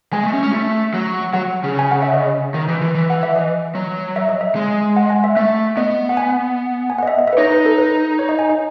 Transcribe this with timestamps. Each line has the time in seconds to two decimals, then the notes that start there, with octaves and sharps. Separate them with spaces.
0.13 G#3 G#5
0.23 A3
0.33 C#4
0.43 C#4
0.53 A3
0.94 F#3
1.33 F#3 F#5
1.64 C#3
1.79 G#5
1.91 F#5
2.02 E5
2.14 D#5
2.54 D#3
2.68 E3
2.81 E3
2.95 E3
3.10 F#5
3.23 E5
3.36 D#5
3.75 F#3
4.16 E5
4.29 D#5
4.41 E5
4.55 G#3
4.96 F#5
5.10 G#5
5.24 E5
5.37 A3 E5
5.77 B3 D#5
6.09 F#5
6.17 G#5
6.90 G#5
6.98 F#5
7.03 D#5
7.07 E5
7.18 D#5
7.27 E5
7.33 B4
7.38 D#4 C#5
7.52 B4
7.66 A4
7.78 B4
8.19 C#5
8.29 D#5
8.39 G#5
8.50 D#5